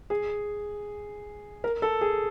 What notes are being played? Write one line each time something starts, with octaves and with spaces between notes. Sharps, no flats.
G#4
A#4
A4
G#4